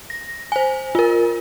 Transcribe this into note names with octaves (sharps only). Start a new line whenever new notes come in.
A#6
C5 G#5
F4 A#4